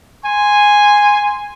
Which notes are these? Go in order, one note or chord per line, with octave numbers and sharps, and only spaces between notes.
G#5 C6